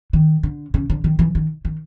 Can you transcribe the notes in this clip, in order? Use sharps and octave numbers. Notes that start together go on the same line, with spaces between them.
D#3
D3
C#3
D3
D#3
E3
D#3
D#3